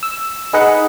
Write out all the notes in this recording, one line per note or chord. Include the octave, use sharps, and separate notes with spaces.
E6
D#4 G#4 B4 D#5 F#5